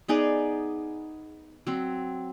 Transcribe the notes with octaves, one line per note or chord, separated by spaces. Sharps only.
B3 D#4 G#4 D5
F#3 C4